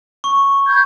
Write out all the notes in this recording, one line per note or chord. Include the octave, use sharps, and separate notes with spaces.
C#6
B5 G6 G#6